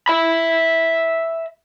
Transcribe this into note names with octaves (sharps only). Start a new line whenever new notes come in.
E5 B5